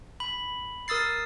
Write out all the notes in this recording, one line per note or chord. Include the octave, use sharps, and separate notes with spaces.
B5
A#4 D#6 E6 A6 C7